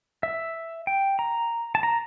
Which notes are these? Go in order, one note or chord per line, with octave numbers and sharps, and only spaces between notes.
E5
G5
A#5
A5
A#5